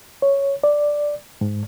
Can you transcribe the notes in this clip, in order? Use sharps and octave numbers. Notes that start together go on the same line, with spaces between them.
C#5
D5
G#2